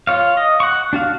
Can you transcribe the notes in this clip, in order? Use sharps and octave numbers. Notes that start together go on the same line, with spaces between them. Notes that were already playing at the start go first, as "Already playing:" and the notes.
F4 C#5 F5
D#5
F#5 C#6
D4 F#4 F5